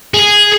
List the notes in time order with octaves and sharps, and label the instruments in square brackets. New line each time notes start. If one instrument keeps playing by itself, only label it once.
[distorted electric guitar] G#4